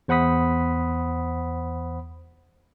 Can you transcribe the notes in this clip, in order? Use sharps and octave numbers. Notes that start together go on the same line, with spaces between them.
E2 C5 F#5 B5 D#6 B6